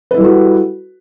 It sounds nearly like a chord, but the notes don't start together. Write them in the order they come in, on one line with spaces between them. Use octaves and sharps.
B4 E4 G3 A4 F#4